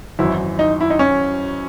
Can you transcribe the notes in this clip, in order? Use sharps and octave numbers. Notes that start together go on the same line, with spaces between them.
G#1 F#2 E3 E4
D#4
E4
D#4
C#4